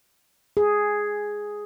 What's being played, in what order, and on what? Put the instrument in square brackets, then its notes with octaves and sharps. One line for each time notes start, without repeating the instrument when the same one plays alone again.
[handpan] G#4